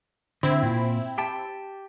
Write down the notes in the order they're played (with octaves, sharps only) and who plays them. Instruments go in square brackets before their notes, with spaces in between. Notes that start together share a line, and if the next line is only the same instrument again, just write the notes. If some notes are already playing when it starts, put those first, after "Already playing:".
[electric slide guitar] D3 [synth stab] C4 E4
[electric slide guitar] A#2
G4 G5 A5